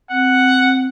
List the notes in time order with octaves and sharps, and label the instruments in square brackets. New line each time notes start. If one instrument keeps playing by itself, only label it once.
[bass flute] C4 [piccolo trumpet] F#5